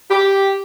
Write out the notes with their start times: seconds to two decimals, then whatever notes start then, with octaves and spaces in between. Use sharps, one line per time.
0.09 G4